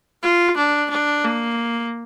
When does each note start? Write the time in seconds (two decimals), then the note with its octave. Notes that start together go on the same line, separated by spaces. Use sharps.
0.23 F4
0.57 D4
0.90 D4
1.24 A#3